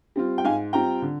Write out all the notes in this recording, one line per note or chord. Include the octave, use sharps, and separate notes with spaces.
G3 C4 F4
G5
G#2 F5 G#5
G3 C4 F4 G5 A#5
D3